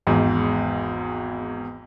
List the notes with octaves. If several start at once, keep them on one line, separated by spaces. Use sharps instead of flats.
G#1 E2 G#2